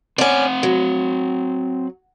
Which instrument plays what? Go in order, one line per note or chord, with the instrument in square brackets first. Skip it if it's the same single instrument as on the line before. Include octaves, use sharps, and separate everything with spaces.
[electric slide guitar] C4 F#5 [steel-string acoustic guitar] C#4 D5
[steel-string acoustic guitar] F#3